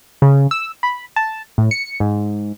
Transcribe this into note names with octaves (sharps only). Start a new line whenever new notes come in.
C#3
E6
B5
A5
A2
C#7
G#2